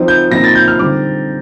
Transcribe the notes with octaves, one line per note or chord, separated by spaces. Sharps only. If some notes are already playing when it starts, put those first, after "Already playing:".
Already playing: F3 C4 D#4
G6
A#2 F3 C4 D#4 A#6
A6
G6
F6
D3 G3 C4 D#4 D6